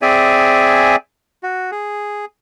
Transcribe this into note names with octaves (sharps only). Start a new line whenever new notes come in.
C4 G#4 D5 E5 G#5
F#4
G#4